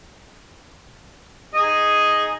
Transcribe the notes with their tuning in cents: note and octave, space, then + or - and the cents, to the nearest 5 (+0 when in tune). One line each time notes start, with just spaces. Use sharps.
D#4 +0 G#4 +0 D#5 +0